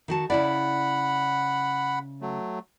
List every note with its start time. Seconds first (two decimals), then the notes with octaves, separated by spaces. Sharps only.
0.08 D#3 F#4 A5
0.30 C#3 E4 D5 F#5 B5
2.21 F#3 A3